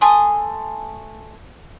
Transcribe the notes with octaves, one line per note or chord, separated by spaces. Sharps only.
A3 G#5 C6 D#6